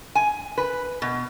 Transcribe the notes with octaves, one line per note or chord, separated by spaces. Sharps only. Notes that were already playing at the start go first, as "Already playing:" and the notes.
G#5
B4
B2